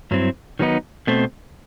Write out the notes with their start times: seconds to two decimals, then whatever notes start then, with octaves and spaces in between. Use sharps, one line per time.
0.11 G2 F#3 C4 E4
0.59 D#3 F#3 B3 D#4
1.07 B2 A3 C4